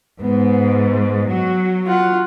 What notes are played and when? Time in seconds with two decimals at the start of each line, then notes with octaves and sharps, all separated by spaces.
0.21 G#2 B3
1.31 F#3 F#4
1.86 F4 F#5